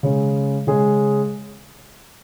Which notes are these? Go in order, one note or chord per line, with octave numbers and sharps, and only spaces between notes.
C#3 G#3 C#4 G#4
C#3 G#3 C#4 G#4